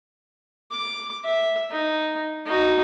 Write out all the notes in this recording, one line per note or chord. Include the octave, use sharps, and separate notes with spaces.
D6
E5
D#4
D#4 F#4